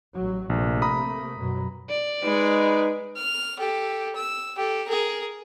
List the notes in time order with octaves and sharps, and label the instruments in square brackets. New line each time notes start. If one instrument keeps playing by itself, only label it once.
[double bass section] A1 F#3
[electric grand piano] A#1 [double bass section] C3 A3 A#3
[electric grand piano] A#5 B5 D#6
[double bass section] F#2 B2 F#3
[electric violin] D5
[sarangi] G#3 [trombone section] D#4 B4
[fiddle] F6
G4 A4
E6
G4 A4
G#4 A#4